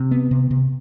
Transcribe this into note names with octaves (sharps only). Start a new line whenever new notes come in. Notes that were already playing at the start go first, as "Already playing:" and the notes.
Already playing: C3
B3
C3
C3